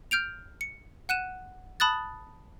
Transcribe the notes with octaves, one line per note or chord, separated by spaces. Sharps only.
F6 G6 D7 F7
C#7
F#5 F#6 D#7 E7
A5 B5 D#6 F#6 A6